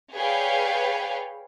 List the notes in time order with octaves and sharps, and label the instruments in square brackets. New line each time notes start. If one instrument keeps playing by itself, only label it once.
[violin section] G#4 B4 C#5 D5 F5 G5